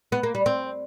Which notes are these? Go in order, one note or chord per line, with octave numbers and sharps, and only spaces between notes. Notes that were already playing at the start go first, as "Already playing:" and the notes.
B3
A#3
G3
C4